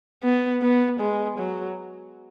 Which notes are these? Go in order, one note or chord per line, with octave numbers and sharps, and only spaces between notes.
B3
B3
G#3
F#3